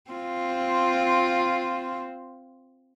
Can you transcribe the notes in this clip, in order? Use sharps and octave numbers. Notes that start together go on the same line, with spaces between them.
C4 F4